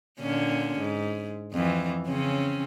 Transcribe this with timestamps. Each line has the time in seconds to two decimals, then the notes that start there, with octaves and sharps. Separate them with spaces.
0.20 A#2 D3 C#4
0.78 G#2
1.53 F2 E3
2.07 C#3 C4 C#4